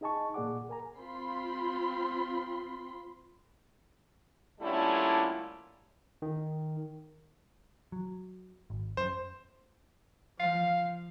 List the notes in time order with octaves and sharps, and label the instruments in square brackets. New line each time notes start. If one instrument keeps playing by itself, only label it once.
[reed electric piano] D#4 G#4 D#5 G#5 A5 C#6
A#2 A#3 G#4 D5 F#5 D6
A#4 G#5 A#5
[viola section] C4 F4 B5 C6
[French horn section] A#2 D3 G3 A3 C#4 E4
[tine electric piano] D#3
[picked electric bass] F#3
G#1
[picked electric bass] F#2 [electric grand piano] C5
[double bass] F3 [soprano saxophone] F5